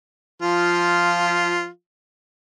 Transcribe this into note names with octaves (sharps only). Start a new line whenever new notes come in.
F3 F4